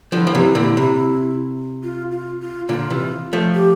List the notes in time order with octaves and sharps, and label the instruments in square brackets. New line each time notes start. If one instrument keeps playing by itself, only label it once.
[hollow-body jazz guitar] D3 F3 [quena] F4
[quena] E4
[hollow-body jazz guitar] F3
C3 E3
A#2 D3
C3
[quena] F4
F4
F4
[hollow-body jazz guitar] A#2 D3 [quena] F4
[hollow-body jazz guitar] C3 E3
F3 A3
[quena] G4